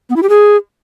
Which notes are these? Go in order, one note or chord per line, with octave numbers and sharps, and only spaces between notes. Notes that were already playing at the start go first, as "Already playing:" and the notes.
B3
E4
G4
G#4